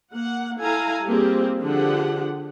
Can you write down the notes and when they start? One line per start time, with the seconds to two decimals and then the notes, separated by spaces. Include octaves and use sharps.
0.13 A#3 F#5
0.60 E4 A4 F5 G#5 A#5
1.05 G3 A#3 C4 F4 G4 G#4
1.61 D3 F3 D4 G4 G#4 F#5